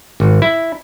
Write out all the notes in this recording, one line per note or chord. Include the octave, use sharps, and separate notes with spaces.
G#1
E4